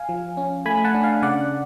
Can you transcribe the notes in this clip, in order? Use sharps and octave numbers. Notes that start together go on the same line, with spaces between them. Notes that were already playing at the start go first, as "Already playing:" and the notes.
Already playing: F5 G#5
F3
C#4
A3 G#5 B5
F#5 A5
D4
F5 G#5
C#3 D5 F#5